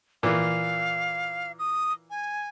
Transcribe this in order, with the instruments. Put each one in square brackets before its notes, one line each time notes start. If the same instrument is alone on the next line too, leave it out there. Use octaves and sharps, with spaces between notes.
[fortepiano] A#2 E3 [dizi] F5
[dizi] D#6
G#5